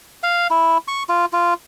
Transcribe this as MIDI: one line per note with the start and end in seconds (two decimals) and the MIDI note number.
0.23 0.47 77
0.51 0.78 64
0.88 1.03 85
1.09 1.25 65
1.33 1.54 65